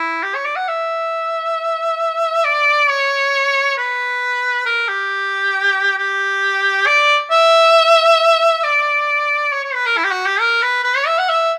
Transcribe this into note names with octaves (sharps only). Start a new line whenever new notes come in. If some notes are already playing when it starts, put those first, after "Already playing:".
Already playing: E4
G4
C#5
D5
F#5
E5
D5
C#5
B4
A#4
G4
G4
D5
E5
D5
C#5
C#5
B4
A#4
E4
G4
F#4
G4
A#4
B4
B4
C#5
E5
F#5
E5